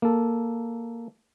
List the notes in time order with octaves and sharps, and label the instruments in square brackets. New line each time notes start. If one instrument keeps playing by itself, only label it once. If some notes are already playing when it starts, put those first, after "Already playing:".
[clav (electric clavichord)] A#3 A4